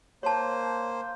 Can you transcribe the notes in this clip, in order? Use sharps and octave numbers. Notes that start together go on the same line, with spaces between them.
A#3 C5 C#5 A5